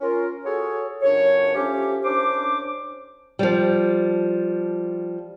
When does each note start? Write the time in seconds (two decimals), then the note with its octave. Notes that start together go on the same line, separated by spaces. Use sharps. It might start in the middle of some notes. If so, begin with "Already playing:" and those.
0.01 C#4 F4 A#4
0.44 F#4 G#4 A4 C#5
1.03 C#2 F#2 D4 C#5
1.55 F3 A3 C#4 G4
2.04 C2 C#4 D4 C5 D6
3.39 F3 G3